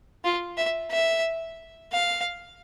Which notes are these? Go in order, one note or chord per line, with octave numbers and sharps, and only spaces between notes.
F4
E5
E5
F5